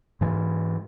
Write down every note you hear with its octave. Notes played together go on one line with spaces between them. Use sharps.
G#2 E3